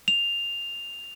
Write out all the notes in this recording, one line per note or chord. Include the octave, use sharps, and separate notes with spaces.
F7